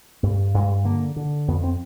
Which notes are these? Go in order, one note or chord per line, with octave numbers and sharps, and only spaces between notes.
G2 A3
G2 G#3
D3 A#3
D3
F2 B3
C4